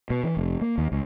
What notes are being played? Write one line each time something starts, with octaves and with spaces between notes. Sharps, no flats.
B2
E3
F1
A#3
D#2
C#2